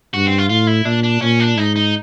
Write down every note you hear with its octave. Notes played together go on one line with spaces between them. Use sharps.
G2 F#4
C4
F4
A2 F4
E4
A#2 D4
D4
A#2 C#4
D4
G#2 D#4
D#4